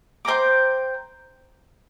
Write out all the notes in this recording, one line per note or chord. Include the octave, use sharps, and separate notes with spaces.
C5 G5 A#5 D6